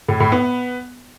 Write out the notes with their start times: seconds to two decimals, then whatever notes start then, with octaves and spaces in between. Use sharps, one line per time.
0.08 A2
0.20 A2
0.32 B3